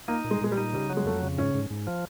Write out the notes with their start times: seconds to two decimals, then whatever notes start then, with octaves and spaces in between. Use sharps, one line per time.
0.08 A#3 D#4
0.24 A#2
0.31 G#3
0.41 A#2 G#3
0.52 G3
0.57 D#4
0.73 C#3 G3
0.90 F#3
0.97 G#3
1.05 F2 A3
1.22 C#3
1.37 G#2 C#4
1.55 G#2
1.70 G#2
1.87 F3